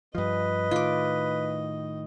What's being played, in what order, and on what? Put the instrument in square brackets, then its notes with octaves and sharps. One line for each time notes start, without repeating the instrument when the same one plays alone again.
[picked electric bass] G2 F3 [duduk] B4 [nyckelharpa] D#5
[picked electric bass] A2 D#3 [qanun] F4 D6